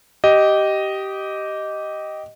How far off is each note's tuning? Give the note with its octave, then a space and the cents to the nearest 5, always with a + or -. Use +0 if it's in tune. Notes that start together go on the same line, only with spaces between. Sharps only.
G4 -15 D#5 +0